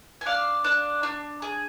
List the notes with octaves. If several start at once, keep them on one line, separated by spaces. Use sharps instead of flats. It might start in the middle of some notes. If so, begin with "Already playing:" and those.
G#5
D4 D5 F5
D4
D4
G#4